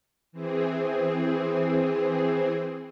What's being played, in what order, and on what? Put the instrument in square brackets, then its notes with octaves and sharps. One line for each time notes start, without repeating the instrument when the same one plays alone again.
[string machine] E3 C4 G#4